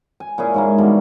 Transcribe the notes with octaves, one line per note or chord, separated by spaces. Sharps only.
G#5
A#2 C#4 E4 G#4
G#2 G#3 A#3
B2 D3 E3 G3